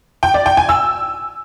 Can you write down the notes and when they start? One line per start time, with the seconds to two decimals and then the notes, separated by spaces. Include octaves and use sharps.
0.23 G5
0.34 D5
0.46 G5
0.57 G#5
0.69 E6